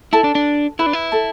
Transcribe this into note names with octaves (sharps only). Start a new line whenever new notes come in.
E4 A4 A5
D4
D4
E4 B4 B5
D4
E4
A4 A5